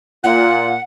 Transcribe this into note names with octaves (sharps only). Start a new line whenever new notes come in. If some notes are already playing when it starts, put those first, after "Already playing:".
A#2 F4 F#5